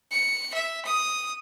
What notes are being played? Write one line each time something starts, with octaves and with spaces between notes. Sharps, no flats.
C#7
E5
D#6